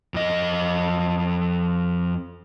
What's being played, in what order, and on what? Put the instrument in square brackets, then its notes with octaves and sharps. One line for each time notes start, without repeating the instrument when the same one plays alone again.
[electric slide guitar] F2 D#5